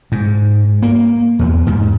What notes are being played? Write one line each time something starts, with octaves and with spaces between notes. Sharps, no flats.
G#2
A#3
E2
G#2